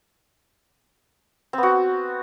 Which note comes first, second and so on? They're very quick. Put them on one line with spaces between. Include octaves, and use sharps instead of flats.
C4 B3 F#4